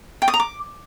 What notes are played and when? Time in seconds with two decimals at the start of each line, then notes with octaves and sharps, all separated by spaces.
0.22 G5
0.28 D#6
0.34 A#5
0.40 D6